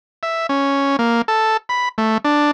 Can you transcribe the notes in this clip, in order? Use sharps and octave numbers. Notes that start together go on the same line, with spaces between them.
E5
C#4
A#3
A4
B5
A3
D4